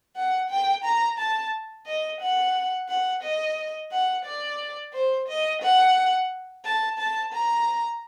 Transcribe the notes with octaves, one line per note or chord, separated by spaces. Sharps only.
F#5
G5
A#5
A5
D#5
F#5
F#5
D#5
F#5
D5
C5
D#5
F#5
A5
A5
A#5